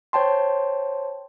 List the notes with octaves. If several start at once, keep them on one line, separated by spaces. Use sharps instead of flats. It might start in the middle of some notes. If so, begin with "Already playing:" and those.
C5 C#5 G5 A5 C6